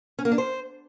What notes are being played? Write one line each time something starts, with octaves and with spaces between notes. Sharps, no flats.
C#4
A#3
D4
C5